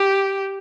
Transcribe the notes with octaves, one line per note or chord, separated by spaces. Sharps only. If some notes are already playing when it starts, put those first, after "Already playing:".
Already playing: G4